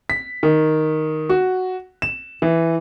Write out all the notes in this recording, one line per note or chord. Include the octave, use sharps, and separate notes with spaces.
B6
D#3
F#4
E7
E3